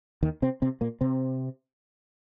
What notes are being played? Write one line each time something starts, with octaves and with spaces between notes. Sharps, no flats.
D#2 D#3
C3 C4
C3 C4
A#2 A#3
C3 C4